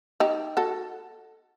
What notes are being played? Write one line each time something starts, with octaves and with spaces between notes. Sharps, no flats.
D#4 G4
F#4 A4